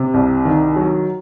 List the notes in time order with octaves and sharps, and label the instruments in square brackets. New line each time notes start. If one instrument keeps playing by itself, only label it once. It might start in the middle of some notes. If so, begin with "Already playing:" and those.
Already playing: [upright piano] C3
C2
D#3
F#3